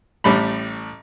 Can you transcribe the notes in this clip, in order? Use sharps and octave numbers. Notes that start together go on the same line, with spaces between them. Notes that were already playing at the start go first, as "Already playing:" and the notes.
A1 A2 G3 B5